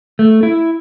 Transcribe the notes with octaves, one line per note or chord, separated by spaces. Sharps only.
A3
E4